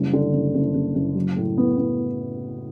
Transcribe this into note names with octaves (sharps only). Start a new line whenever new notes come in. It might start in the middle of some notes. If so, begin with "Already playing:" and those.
Already playing: F#1 G3
D3
F#1
F#1
F#1
F#1
F#3
A2
B3
B3